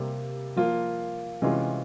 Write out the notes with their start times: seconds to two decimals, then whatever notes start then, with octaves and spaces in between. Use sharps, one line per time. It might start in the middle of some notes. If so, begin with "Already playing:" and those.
Already playing: C3 G3 A#3
0.56 F3 A#3 F4
1.42 C3 E3 G#3 C#4 F4